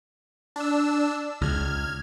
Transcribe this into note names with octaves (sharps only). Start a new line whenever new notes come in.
D4 E6
C#2 F6 G#6